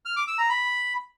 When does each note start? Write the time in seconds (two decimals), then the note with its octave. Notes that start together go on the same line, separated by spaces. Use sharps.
0.05 F6
0.16 D6
0.27 E6
0.38 A#5
0.49 B5